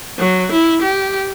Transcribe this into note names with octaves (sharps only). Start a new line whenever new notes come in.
F#3
E4
G4